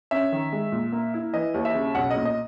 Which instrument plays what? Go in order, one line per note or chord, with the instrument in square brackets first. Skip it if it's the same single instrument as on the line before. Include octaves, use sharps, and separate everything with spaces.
[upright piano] C#4 E5
D#3
G#3
A#2
A#3
E4
E3 D#5
D#2
E5
C#3
B1 F#5
D#5
A#2
D#5